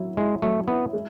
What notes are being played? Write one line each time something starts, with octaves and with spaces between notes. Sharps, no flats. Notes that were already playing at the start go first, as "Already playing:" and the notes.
Already playing: F#3 E4
G#3 E4
F#3 A3
B3 E4
G#3